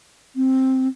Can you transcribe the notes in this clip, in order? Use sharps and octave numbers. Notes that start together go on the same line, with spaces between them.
C4